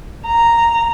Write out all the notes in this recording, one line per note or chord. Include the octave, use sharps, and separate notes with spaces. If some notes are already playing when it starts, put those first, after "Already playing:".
A#5